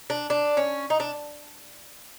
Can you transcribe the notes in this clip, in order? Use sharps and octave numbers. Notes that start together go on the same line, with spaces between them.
D4
D4
C#4
D#4
D4